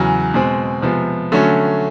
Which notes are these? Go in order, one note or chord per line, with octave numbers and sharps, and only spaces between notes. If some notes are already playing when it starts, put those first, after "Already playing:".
Already playing: E2 C#3 F#3
B2 G#3 C4
C3 F3 G#3 B3
D3 F#3 A3 C#4